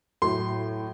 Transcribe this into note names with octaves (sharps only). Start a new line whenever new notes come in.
A2 F#3 C6